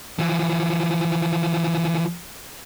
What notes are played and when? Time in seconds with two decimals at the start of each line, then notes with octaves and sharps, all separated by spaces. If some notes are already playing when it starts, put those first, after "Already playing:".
0.19 E3 F3